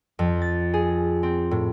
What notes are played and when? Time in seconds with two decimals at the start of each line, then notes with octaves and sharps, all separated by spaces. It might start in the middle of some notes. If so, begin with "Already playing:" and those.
0.19 F2
0.42 A6
0.74 G#4
1.23 C4
1.51 A2